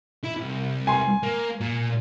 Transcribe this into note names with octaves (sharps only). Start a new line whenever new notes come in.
E4
C2
G#5 C6
A#3
A#2